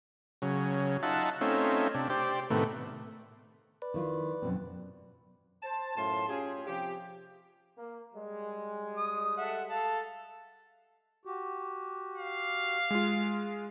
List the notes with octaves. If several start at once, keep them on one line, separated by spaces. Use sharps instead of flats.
C#3 F#3
D#4 F4 E5 F#5 A5
A3 C4 C#4 D#4 F4 E5
C3 D4
G4 C5 D5
A2 C3 D#3 A3 B3
B4 D5
D#3 E4 F4
F#2 B2 C4
C5 A5
F#2 A2 F4 A5 C6
C#4 F4 G4 G#4
C3 F3 G4
A#3
G3 G#3
D#6
A4 E5 F#5
A4 F5 A5
F#4 G4
F5
G#3 F4